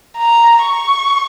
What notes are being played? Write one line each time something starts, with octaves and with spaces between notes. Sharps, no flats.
A#5
C#6